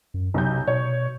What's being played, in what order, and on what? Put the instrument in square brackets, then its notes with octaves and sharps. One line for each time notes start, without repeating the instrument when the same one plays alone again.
[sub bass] F#2
[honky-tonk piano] B1 G6 [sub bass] C3
[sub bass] B2 [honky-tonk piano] C#5